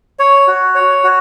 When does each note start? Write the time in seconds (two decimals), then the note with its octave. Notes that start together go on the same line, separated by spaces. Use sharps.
0.19 C#5
0.47 F#4
0.75 C#5
1.04 F#4